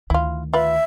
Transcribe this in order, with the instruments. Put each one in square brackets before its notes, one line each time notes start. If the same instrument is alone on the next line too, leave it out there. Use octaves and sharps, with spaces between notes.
[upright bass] D2 D#3 [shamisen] E4 F4
[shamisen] F4 B4 [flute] E5